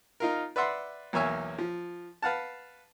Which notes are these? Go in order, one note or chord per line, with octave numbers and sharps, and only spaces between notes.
D#4 F4 A#4
B4 D5 E5 F#5 C6
B1 E2 A#3 C#5 E5 G#5
F3
B4 F5 F#5 A5